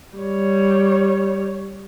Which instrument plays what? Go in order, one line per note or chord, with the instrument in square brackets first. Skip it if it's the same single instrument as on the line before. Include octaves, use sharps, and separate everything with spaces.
[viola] G3 C#5